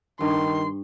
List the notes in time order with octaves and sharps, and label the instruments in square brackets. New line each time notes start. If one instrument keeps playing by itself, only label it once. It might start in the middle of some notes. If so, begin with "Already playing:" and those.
[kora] G2 [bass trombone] D#3 [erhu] C6